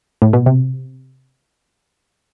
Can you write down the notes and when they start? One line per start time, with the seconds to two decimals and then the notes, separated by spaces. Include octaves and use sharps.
0.22 A2
0.33 B2
0.46 C3